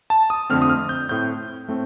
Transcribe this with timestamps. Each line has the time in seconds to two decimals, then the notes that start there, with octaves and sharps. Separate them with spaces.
0.10 A5
0.30 D#6
0.50 F2 D3 A3 C4 F6
0.62 D#6
0.70 F6
0.89 G6
1.09 A2 A3 C4 G6
1.68 A2 A3 C4